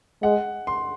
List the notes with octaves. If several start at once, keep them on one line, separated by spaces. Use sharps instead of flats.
G#3 F#5
C6